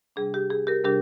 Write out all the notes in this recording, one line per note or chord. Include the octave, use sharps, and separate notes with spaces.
C3 G3 D4 G#4
G4
G#4
G4 A#4
C3 G3 D4 G4 A#4